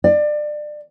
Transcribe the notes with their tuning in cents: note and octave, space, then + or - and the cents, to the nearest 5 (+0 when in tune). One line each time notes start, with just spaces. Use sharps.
D5 +25